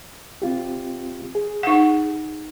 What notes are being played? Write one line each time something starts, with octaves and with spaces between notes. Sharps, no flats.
C4 F4 G4
G#4
D#4 F#5